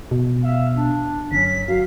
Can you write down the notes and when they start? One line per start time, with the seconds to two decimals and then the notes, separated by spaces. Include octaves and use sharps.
0.11 B2
0.43 E5 F5
0.76 D4
1.32 G1 F#3 C#4 B6
1.68 F#3 F5